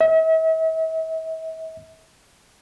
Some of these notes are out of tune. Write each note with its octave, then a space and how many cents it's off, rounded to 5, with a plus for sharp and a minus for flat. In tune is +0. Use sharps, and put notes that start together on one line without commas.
E5 -40